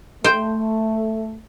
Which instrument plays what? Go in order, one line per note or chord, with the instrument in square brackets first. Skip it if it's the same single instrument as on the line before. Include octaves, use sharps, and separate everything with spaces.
[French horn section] A3 [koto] C5 G5